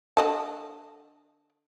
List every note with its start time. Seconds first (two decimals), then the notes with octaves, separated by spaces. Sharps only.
0.17 D3 D#5 A5